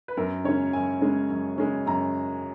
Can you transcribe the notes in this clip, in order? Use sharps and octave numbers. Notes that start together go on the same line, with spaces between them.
B4
F#2 A#4
C#3 G#3 C#4 C#5
F#2 G#5
C#3 G#3 C#4
F#2
C#3 G#3 C#4
F#2 A#5